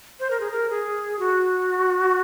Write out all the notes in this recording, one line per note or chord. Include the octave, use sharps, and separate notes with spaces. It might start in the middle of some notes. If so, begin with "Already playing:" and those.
C5
A#4
G#4
A#4
G#4
F#4